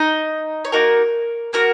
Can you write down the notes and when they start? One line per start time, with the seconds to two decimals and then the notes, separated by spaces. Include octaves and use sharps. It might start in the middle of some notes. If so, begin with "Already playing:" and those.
Already playing: D#4 D#5
0.65 C#5
0.72 A#3 D#4 F#4 A#4
1.53 A#3 F#4 A#4